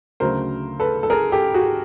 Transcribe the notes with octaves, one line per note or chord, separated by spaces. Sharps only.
D2 C#3 F#3 A3 A#4 C5
A4 B4
A4
G#4 A#4
G4 A4
F#4 G#4